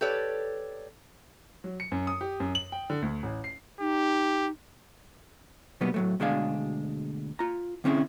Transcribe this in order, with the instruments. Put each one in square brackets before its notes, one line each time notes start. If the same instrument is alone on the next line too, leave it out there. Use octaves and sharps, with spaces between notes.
[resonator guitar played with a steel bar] G4 A4 B4 C#5 D5
[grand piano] F#3
C#7
F#2
D#6
G4
F#2
F#7
G5
D3
D2
A1
C7
[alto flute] D#4 [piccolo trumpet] G4
[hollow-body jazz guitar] B2 F#3 G3 A#3 B3
A2 F#3 A3
D2 B2 G#3 D4 G#4 F5
F4 A#5
D3 C4 C#4 E4 G#4